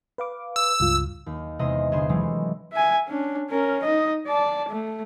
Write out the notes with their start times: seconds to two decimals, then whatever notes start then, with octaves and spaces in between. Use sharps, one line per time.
0.18 B4 F5 D6
0.56 E6
0.80 C#2 G2 F4
1.26 D#2
1.59 E2 C3 G#3 D#5 C6 E7
1.92 G1 G#4 C6 E7
2.09 E3 F#3 G#3 A3 C4
2.73 E5 G#5
3.08 C#4 D4
3.50 C#4 A#4
3.83 D#4 D#5
4.27 D5 A5
4.69 A3